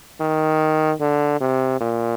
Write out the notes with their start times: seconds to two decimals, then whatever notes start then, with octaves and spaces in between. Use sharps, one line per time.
0.21 D#3
1.01 D3
1.41 C3
1.81 A#2